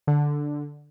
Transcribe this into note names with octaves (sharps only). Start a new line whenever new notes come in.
D3